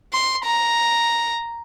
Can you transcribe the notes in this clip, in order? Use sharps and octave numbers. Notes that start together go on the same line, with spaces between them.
C6
A#5